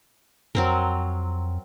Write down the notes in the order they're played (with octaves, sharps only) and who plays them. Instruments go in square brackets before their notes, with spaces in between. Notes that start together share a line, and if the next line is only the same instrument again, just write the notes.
[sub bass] F2 [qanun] F#3 C4 A#4